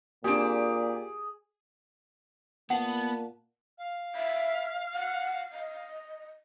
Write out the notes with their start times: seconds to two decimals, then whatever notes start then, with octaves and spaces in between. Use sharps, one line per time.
0.24 A#2 A#3 C4 D4 G4 G#4 D7
2.70 A#2 A#3 B3 F#5 A5
3.78 F5
4.15 E5
4.94 F#5
5.52 D#5